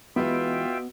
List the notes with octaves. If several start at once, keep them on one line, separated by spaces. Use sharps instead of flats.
B2 E3 G#3 B3 E4 F4 E5 G5